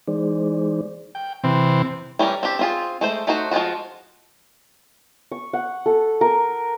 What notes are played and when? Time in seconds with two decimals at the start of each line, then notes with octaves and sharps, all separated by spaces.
0.08 E3 G#3 D#4 G#4 C5 D5
1.15 G5
1.44 C3 E3 C4
2.19 E3 G3 C#4 G#4 A#4
2.43 C4 D4 G4
2.59 C4 F4 G#4
3.01 G#3 A3 C5
3.27 A3 D#4 F#4 C5
3.51 F3 G#3 B3 F4 F#4
5.32 C#6
5.53 F#5
5.86 A4
6.21 A#4